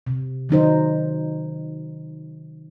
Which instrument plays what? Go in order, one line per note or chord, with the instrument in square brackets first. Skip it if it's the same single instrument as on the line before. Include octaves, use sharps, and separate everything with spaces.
[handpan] C3
D#3 F#3 D#4 C5